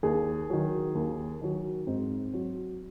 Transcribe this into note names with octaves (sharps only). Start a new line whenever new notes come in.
D#2 G#4
D#3 F#3
D#2
D#3 F#3
G#2 C4
F#3